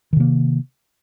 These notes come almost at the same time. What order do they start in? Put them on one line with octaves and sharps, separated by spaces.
D#3 C3 A#3